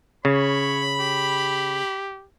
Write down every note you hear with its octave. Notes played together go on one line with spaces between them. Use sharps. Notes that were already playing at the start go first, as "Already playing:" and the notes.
C#3 C#5 B5
G4